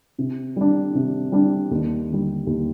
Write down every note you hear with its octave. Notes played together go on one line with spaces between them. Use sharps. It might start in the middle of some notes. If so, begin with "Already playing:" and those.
C3
G3 D4
C3
G3 D4
D#2
D3 G3
D#2